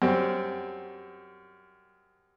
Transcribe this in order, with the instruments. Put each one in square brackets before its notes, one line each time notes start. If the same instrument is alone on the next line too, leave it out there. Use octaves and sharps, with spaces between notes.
[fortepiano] F#2 G3 C4